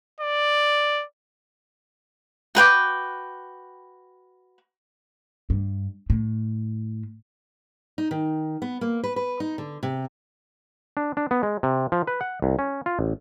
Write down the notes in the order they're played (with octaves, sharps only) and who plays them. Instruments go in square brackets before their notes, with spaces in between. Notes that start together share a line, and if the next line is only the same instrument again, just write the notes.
[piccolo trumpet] D5
[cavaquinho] F#4 B4 G5 D6
[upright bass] G2
A2
[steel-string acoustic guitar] D#4
D#3
B3
A#3
B4
B4
D#4
D3
C3
[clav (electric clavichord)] D4
D4
B3
G#3
C3
F3
B4
F#5
C2
C#4
F4
A1